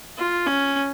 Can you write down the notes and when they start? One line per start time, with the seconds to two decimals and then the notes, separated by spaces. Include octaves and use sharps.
0.17 F4
0.47 C#4